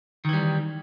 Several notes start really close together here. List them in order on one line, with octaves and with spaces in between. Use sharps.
D#3 E3 G3